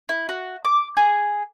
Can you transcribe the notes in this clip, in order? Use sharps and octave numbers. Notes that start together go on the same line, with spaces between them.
E4
F#4
D6
G#4